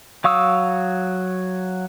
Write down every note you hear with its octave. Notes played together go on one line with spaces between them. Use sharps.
F#3 F5 C#6 D#6 E6